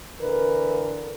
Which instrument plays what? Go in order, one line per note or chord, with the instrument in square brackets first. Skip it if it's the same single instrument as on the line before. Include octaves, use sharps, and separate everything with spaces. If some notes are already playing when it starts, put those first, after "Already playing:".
[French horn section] D3 E3 A#4 [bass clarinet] B4